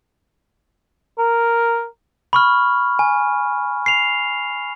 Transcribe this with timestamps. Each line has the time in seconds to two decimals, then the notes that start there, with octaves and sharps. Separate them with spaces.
1.18 A#4
2.33 B5 C#6 F6
2.99 G#5
3.86 C7 F7